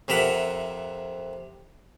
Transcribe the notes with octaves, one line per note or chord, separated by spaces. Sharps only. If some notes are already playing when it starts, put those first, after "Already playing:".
F2 C3 A#4 E5 F#5